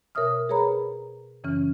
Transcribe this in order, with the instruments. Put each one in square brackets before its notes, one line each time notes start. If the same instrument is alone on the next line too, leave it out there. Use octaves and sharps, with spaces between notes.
[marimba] B2 A#4 C#5 E5 D#6 F6
G#4 A#4 B4 C#5 A#5 B5
F#2 C#3 E3 C#4 F6